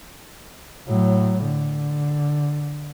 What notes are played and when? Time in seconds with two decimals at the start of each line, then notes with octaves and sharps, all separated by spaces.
0.88 A2 F#3
1.45 D3